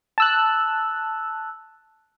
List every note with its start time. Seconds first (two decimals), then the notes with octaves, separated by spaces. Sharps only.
0.18 A5 E6 F#6